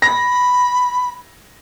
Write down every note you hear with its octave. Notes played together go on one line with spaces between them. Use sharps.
B5 A#6